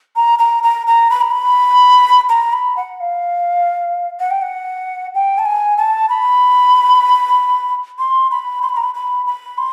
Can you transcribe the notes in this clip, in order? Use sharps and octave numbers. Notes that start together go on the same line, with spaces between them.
A#5
A#5
A#5
A#5
B5
A#5
B5
A#5
B5
F#5
F5
F#5
G5
F#5
G5
A5
G#5
A5
B5
C6
B5
C6
B5
A#5
B5
B5
B5
C6